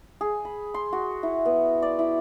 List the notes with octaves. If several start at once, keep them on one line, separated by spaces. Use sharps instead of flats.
G#4
B5
C6
F#4
E4
B3
D5
E4